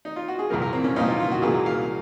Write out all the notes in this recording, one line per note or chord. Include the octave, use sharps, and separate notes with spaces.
D#4
F4
F#4
G#4
C2 A#2 F3 A#3 A#4
A#4
C4
C#4
C2 A#2 F3 A#3 D#4
F4
F4
F#4
C2 A#2 F#3 A#3 G#4
F5